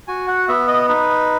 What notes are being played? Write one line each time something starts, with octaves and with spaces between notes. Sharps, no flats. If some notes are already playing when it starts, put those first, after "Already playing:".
F#4 G#5
F#5
B3 E5
D#5
D#4 B4